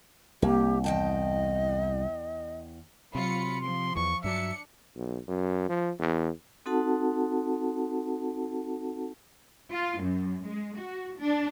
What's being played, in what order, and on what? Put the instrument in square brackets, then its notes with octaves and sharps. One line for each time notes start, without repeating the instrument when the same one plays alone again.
[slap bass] C2 [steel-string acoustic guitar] A#3 [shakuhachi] G4
[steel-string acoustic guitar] E2 G5 A5 [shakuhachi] D#5
[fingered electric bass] C3 [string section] F#3 F4 C#7 [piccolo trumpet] B5
[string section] F3 [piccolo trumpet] C6
[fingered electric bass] E2 E3 [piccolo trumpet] C#6
[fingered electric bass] G2 F#3 [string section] D4 C#7 [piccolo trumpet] E5
[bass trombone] B1
F#2
F3
E2
[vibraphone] C4 D#4 F#4 A4 F#5 A5
[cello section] F4
F#2
G#3
F#4
D4